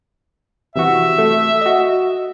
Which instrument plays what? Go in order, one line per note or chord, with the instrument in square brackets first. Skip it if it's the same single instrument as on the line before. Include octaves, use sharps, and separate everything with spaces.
[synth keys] C3 E3 F#4 [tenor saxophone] E5
[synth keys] A3
F#4 D#5